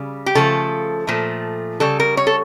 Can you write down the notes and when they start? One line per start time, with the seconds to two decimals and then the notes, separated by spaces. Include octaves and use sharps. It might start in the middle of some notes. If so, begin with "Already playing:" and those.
Already playing: C#3 G3
0.26 G4
0.35 C#3 F3 A3 A4
1.07 A#2 F3 A3
1.80 C#3 G3 A4
2.00 A#4
2.17 C#5
2.27 A4